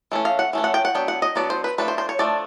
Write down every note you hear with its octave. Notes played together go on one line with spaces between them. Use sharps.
E3 A3 C#4
F5
F#5
E3 A3 C#4
F#5
G5
F#5
F#3 B3 D4 G5
F#5
D#5
F#3 B3 D4 D5
C5
B4
F3 A3 D4 B4
C5
C5
C#5
F3 A3 D4 D5